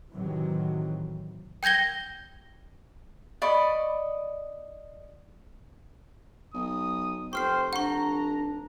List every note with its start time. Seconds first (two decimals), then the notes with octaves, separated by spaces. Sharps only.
0.11 A2 C3 D#3 E3 F#3
1.63 G5 G6 G#6 A#6 G7
3.42 D5 D#5 B5 C#6
6.54 B1 D#6
7.33 F1 C5 G5 C#6 F6 C7
7.73 D4 F#5 A#5 C#6